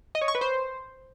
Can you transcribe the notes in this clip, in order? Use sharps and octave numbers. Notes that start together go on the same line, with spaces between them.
D#5
C#5
C#6
B4
C5